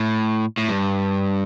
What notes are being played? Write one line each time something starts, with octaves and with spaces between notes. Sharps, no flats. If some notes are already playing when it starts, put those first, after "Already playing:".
Already playing: A2
A2
G2